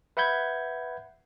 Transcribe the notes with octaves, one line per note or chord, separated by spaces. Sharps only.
B4 E5 F#5 B5 G6 G#6